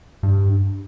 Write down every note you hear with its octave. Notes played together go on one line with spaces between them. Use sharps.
G2